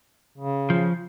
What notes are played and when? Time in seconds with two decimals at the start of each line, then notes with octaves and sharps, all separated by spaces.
0.38 C#3
0.70 F3